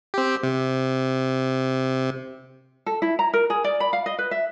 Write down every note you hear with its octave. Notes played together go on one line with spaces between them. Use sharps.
C4 G4
C3
A4
E4
A#5
A#4
G#4
D5
B5
F5
D#5
B4
E5